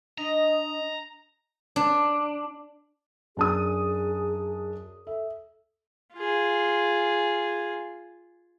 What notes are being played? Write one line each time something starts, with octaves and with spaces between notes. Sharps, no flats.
D4 D#5 A#5
D4
F#2 D4 G#4 D#6
A4 E5
F4 G#4